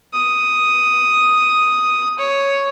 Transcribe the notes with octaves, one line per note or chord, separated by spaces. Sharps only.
D#6
C#5